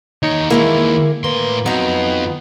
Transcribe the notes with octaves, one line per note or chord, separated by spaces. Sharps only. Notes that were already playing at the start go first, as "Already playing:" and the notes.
D#2 D#4 C#5
E3 G#3 A#3 E4
A2 A#3 B4 C6
F2 F#3 B3 D#4